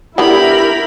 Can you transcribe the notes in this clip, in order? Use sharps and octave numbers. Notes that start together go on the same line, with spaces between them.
D3 B3 E4 G4 A#4 B5